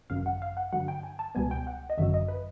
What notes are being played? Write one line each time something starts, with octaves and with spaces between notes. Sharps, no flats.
G#1 F#2 C#3 F5
F#5
F5
F#5
G2 D3 F#3 F#5
G5
G#5
A5
C#2 B2 G3 B3 G#5
G5
F#5
D#5
G#1 F#2 D3 F#3 E5
D#5
B4